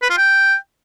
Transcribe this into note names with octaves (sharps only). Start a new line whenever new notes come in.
B4
F4
G5